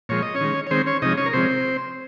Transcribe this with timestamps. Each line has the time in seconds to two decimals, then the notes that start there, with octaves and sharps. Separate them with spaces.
0.09 A#2 F3 G#3 C#5
0.22 D#5
0.35 C#4 C#5
0.41 D#3 G#3
0.67 C#5
0.71 D#3 G#3 C4 C5
0.86 C#4 C#5
1.02 C3 F3 G#3 D#4 D#5
1.17 C#4 C#5
1.26 A#4
1.33 C3 F3 G#3 C4 C5